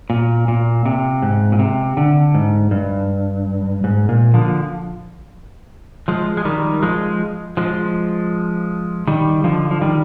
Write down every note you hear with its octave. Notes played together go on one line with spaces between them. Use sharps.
A#2
A#2
C3
G#2
A#2
C3
D3
G#2
G2
G#2
A#2
D3 F3
F3 G#3
G#3
D#3 G3
F3 G#3
F3 G#3
D#3 G3
D3 F3
F3
D#3 G3